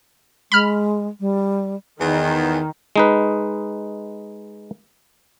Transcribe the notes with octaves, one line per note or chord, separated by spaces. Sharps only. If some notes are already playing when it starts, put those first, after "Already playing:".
G#3 B5 F6
G3
E2 D#3
G#3 D#4 B4